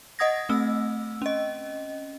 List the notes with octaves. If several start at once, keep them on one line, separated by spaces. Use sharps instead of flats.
D#5 F#5 D#6 G#6 A#6
A3 C4 E6
C#4 D#5